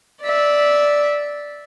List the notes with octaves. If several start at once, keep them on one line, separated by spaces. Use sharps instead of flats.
D5 E5